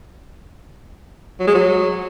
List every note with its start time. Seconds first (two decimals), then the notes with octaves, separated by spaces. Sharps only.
1.40 F#3
1.47 G#3
1.55 F#3